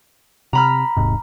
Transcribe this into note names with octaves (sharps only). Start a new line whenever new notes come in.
C3 A#5 B5 F6
D#1 G#2 C3